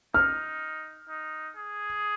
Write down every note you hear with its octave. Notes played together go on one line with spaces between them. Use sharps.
D#4 F6
D#4
G#4